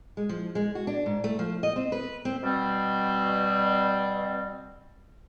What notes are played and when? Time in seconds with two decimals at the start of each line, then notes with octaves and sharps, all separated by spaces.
0.17 G#3
0.29 F3
0.55 G#3
0.75 F#4
0.87 D4
1.06 G#2
1.24 A3
1.39 F3
1.63 D#5
1.76 C4
1.92 B4
2.25 C4
2.43 B2 G3 C4